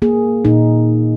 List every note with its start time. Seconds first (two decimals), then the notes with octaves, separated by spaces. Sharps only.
0.02 A#3 G#4
0.45 A#2 D#4